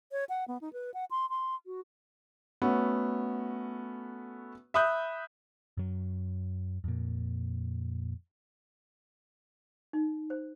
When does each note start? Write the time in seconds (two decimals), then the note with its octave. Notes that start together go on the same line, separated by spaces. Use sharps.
0.12 C#5
0.29 F#5
0.48 B3
0.61 D#4
0.73 B4
0.94 F#5
1.11 C6
1.30 C6
1.66 F#4
2.62 A3 B3 C#4 F#4
4.74 E5 B5 D#6 F#6 G6
5.77 F#2 F#3
6.84 F2 A#2
9.93 D#4
10.30 C5